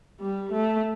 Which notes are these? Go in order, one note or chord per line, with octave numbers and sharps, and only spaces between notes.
G3
A3